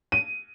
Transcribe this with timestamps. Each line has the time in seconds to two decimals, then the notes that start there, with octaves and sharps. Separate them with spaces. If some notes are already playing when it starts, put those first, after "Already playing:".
0.12 D#7